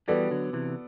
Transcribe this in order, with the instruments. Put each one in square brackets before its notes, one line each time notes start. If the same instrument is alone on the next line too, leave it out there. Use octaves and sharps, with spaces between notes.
[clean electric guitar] E3 G3 [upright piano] B3 F#4 A4 D5
[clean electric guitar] D3 F#3
C3 E3